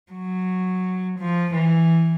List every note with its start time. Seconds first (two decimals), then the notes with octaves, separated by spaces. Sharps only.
0.12 F#3
1.19 F3
1.54 E3